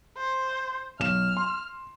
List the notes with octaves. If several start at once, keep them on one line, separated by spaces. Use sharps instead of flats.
C5
B1 F6 E7
C6